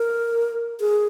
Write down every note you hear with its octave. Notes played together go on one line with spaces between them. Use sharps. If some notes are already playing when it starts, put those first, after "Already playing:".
Already playing: A#4
G#4